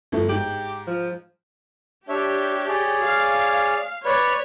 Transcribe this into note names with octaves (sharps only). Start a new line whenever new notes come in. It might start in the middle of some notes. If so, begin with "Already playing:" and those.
G1 F3 A3
G#2 G4 F#7
F3
D4 G4 C#5 E5
G#4 C#5 D5
F5
B4 C#5 D5 B5